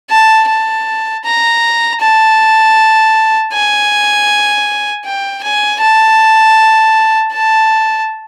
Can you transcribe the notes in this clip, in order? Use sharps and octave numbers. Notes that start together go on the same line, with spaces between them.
A5
A5
A#5
A5
G#5
G5
G#5
A5
A5